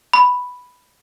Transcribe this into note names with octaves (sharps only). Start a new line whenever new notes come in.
B5